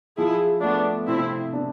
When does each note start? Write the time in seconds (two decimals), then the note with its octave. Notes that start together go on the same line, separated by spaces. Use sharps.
0.18 F3 E4 G#4
0.62 A3 B3 D4
1.08 C3 C4 E4
1.53 D4